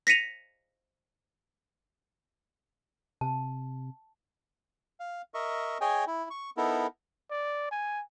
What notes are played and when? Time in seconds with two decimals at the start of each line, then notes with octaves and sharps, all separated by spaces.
0.07 A#6 B6 C#7 D#7 F7
3.21 C3 A5
5.00 F5
5.34 A#4 D#5 E5 C#6
5.81 G#4 C#5 D#5 G5 G#5
6.07 E4
6.30 C#6
6.57 B3 D#4 E4 A4 A#4
7.31 D5
7.72 G#5